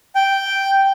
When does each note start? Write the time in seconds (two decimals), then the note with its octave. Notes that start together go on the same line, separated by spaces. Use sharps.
0.15 G5